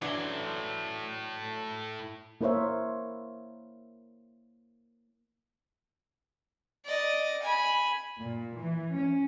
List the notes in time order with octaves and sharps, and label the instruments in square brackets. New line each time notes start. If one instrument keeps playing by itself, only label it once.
[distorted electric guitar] A2 C6 [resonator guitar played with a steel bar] E3 F#3 D4
[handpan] A#3 E4 A#4 C5 C#5 E5
[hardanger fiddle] D5 D#5
G#5 B5
[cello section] A#2
E3
C#4